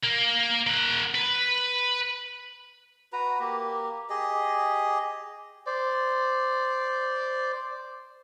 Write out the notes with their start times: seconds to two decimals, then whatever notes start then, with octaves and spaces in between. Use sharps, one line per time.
0.04 A#3
0.67 A#3 F#5
1.15 B4
3.13 F#4 B4 A#5
3.40 A#3 G4
4.10 G4 G#4 D#5
5.67 C5 D5